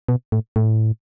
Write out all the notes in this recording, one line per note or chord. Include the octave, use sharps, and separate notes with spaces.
B2
A2
A2